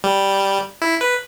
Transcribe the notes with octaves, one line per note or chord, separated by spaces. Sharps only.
G3
E4
B4